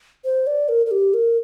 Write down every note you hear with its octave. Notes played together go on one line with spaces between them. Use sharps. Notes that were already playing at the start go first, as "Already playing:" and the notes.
C5
D5
A#4
A#4
G4
A#4